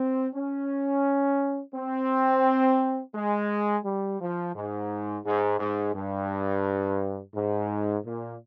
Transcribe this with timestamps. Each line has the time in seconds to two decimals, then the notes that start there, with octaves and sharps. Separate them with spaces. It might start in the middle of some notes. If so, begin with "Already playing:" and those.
Already playing: C4
0.35 C#4
1.75 C4
3.15 G#3
3.85 G3
4.20 F3
4.55 G#2
5.25 G#2
5.60 G#2
5.95 G2
7.35 G#2
8.05 A#2